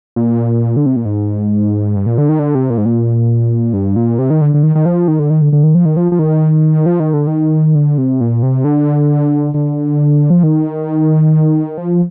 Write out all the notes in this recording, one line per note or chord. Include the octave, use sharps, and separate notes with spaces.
A#2
D3
C3
A#2
G#2
G2
A#2
D3
D#3
D3
C3
A#2
G#2
A#2
G2
A#2
C3
D#3
D3
D3
D#3
D#3
F3
D#3
D3
D#3
D3
D3
D#3
F3
D#3
F3
F3
D#3
F3
D#3
D3
D#3
D3
C3
A#2
C3
D3
D3
F3
D#3
F3